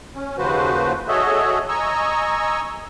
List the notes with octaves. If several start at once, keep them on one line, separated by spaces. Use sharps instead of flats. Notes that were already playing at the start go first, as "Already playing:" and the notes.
C#4
D#2 C#3 F3 F#4 B4 C5
F#4 G#4 A4 C#5 D#5 E5
D#5 G#5 A#5 C#6 E6